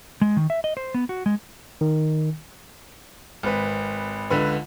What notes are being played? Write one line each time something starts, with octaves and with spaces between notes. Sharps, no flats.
G#3
D#3
E5
D#5
C5
B3
F#4
G#3
D#3
G#1 B4
C#2 D3 B4